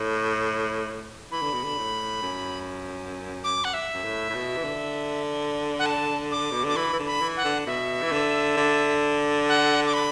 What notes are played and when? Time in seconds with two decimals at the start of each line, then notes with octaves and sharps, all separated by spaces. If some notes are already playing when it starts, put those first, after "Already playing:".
Already playing: A2
1.32 E3 B5
1.42 D3
1.53 B2
1.63 D3
1.78 A2
2.22 F#2
3.44 D6
3.64 F#5
3.74 E5
3.94 F#2
4.04 A2
4.30 A2
4.34 B2
4.57 E3
4.64 D3
5.79 F#5
5.86 A5
6.31 D6
6.51 B2
6.64 D3 D6
6.76 E3 B5
6.93 E3
6.99 D3
7.06 B5
7.21 E3
7.37 F#5
7.44 D3
7.66 B2 E5
8.03 E3
8.12 D3
8.57 D3
9.49 F#5
9.86 D6
9.94 B5